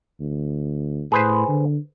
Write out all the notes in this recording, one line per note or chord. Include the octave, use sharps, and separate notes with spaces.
D2
A2 G#4 B4 C5
D3